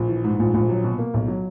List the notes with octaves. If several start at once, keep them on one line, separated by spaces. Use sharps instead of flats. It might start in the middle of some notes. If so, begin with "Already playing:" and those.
Already playing: A#1
E3
G#2
A#1
A#1
F#3
B2
A#3
B1
F#3